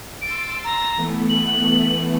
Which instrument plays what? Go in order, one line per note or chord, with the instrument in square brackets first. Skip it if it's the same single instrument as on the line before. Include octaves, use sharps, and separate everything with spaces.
[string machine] C6 E6 A6 [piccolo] D7
[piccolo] A#5
[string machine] E3 A3 B3
[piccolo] F#7